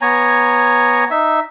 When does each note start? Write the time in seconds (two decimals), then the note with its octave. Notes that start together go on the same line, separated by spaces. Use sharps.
0.01 B3 C#5 G#5 A#5
1.11 D#4 E5